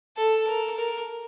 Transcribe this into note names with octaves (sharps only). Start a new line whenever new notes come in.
A4
A#4
A#4